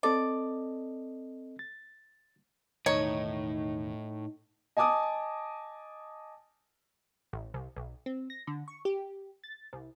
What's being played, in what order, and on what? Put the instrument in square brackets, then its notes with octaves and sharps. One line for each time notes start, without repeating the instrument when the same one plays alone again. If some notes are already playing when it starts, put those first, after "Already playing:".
[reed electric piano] C4 A4 D#5 [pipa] D5
[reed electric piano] A6
[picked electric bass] E1 D#3 [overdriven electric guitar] A2 [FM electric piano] D#4 [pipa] C#5
[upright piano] D#5 G#5 A5 D6 D#6
[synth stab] A1
C2
B1
C4
A#6
D3
C#6
G4
A6
C2